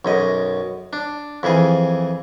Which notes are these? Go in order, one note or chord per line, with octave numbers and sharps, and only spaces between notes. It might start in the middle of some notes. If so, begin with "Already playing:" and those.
B1 F#2 D#5
D4
F2 E3 G#4